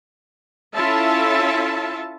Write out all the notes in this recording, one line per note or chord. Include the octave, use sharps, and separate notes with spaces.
C#4 E4 F4 A4 E5 A5